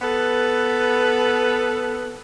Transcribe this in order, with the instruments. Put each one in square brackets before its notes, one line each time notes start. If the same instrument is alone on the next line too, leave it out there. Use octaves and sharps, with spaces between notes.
[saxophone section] B3 A4 B4